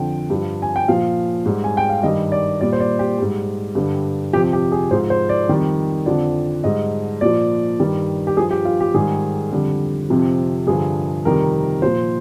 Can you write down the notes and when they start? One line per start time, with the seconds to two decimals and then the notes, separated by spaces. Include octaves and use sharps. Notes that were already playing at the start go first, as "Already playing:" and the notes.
Already playing: F2 D3 F3 G5
0.30 G2 F3
0.62 G#5
0.76 G5
0.88 A#2 F3 F5
1.46 G#2 G3
1.64 G#5
1.77 G5
1.89 F5
2.03 G2 D#3 G3 D#5
2.32 D5
2.60 A#2 G3 D5
2.73 C5
2.80 D5
2.99 G4
3.18 G#2 G3
3.75 G2 D3 G3
4.33 F2 C3 F3 G4
4.53 G4
4.72 G#4
4.91 G#2 F3 C5
5.10 C5
5.29 D5
5.49 F2 D#3 G3
6.06 F2 D3 F3 D5
6.64 G#2 G3 D#5
7.21 A#2 F3 D5
7.79 G2 D#3 G3
8.27 G4
8.37 G2 F3 G#4
8.51 G4
8.65 F4
8.80 G4
8.94 G#2 D#3 G3 G#4
9.52 F2 D3 G3
10.10 F2 C3 F3
10.67 G2 D3 F3 G#4
11.25 F2 C3 D#3 G3 A#4
11.82 A#2 F3 C5